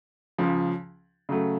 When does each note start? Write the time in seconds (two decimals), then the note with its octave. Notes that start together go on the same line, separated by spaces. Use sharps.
0.38 C#2 C#3 F3
1.29 C#3 F#3 A3